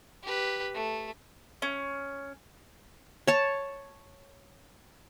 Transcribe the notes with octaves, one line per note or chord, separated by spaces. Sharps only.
G4 B4
A3
C#4
C#5 A5